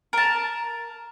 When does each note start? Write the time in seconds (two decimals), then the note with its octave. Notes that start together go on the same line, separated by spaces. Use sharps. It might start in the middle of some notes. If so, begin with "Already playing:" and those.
0.13 A#4 A5